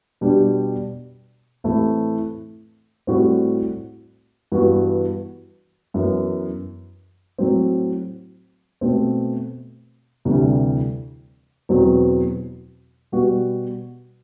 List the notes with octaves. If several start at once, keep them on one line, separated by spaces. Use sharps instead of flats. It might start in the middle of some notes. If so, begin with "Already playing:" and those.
B2 G3 D4 G4
A2 E3 A3 C4 E4
A2 G3 C4 F#4
G2 E3 B3 F#4
F#2 E3 B3
A2 F#3 C4
B2 A3 C4
D2 C3 E3 G3
E2 B2 F#3 C4
B2 G3 B3 F#4